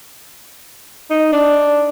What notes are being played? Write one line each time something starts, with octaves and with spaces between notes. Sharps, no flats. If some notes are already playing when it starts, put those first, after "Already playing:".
D#4
D4